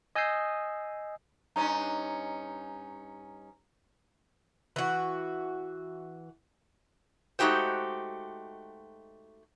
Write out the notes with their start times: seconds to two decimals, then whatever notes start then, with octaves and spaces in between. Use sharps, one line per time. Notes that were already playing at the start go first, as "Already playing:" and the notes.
0.15 D#5 G#5 D#6 E6 G6 C7
1.56 G2 C#4 D#4 A#5
4.76 E3 F#4
7.39 G#3 A3 D#4 F#4 G4 C5